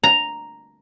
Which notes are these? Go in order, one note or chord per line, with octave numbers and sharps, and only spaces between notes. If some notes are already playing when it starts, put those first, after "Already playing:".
A#5